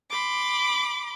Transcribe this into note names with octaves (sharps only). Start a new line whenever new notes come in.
B5 C6 D6